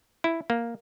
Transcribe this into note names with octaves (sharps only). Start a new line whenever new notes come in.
E4
A#3